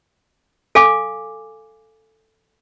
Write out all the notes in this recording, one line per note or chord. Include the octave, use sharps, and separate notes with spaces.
A4 F5 G#5 D6